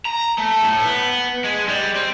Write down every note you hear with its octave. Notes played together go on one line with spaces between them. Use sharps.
A#5
A3
A2
B3
G#3
G3
C4